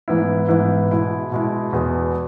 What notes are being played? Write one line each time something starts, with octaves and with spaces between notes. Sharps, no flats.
G#2 E3 B3 E4
G#2 E3 B3 E4
B2 G#3 E4
B2 G#3 E4
E2 B2 B3 G#4